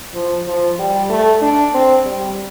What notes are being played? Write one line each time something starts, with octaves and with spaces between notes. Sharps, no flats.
F3
F3
G3
A3
D4
C4
G3